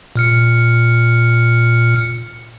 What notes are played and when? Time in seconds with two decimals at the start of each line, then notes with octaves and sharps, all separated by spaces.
0.16 A#2 F6 C#7